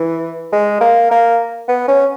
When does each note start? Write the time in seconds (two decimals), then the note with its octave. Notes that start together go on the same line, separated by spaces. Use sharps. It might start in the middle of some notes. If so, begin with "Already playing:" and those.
Already playing: E3
0.52 G#3
0.81 A#3
1.11 A#3
1.68 B3
1.88 C#4